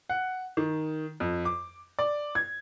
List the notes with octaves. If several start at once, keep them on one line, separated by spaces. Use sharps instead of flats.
F#5
D#3
F2
D6
D5
G#6